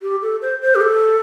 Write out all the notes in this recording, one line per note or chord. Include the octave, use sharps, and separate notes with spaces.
G4
A4
C5
C5
G4
A4